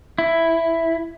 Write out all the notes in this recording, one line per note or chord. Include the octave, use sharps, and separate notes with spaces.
E4